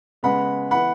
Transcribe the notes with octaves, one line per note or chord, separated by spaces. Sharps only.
C#3 G#3 B3 F#5 B5
E3 B3 F#5 B5